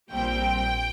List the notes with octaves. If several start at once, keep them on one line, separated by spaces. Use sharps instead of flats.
A#1 A#2 G3 C4 G5